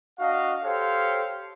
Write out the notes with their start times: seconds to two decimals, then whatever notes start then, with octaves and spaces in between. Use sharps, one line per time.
0.19 D4 F#4 D#5 F5
0.63 G4 A4 C5 C#5 F5